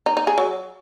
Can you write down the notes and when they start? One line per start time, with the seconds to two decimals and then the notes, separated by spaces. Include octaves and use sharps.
0.06 D#4
0.17 D#4
0.27 G#4
0.38 F#3